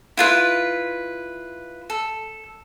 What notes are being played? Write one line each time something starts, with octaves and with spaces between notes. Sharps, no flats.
E4 F4 B4
A4